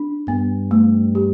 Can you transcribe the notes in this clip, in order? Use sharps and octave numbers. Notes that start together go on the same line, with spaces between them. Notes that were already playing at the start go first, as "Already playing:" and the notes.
Already playing: D4
G2 B3
A3
G4